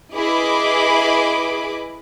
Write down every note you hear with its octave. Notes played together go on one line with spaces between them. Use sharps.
E4 G#4 B4 D#5 B5 D6